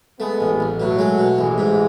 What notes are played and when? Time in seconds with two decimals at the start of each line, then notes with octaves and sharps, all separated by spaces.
0.20 G#3 A3 B3
0.40 A1
0.60 A1
0.79 B2 F#3 A3
0.99 G#3
1.18 B2
1.38 A1 E3 G#3
1.58 G#2